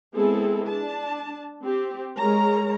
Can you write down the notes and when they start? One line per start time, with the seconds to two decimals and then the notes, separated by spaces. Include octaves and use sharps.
0.15 G#3 B3 C4 E4 G#4 A4
0.68 D4 A5
1.64 C4 G4
2.18 G#3 A#4 C#5 A#5